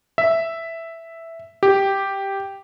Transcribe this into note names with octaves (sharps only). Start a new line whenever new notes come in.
E5
G4